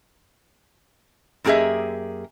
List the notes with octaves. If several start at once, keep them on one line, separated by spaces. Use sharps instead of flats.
F#2 A#3 G4 G#4 D#5 E5